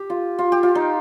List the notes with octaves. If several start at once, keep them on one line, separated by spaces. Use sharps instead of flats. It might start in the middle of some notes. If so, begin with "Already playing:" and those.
Already playing: G4
F4
F4
G4
F4
D#4